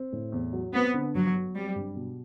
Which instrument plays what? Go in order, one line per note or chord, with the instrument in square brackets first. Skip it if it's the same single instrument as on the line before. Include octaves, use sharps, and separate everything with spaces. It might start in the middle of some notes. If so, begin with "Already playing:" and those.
Already playing: [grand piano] C4
A2
E2
F#3
[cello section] B3 [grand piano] C4
[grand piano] D3
[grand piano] G1 [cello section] F#3
[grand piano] F#3
[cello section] G3 [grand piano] C4
[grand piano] G2
B2